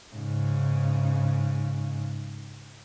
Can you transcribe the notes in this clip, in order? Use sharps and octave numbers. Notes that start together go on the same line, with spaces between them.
G#2 C#3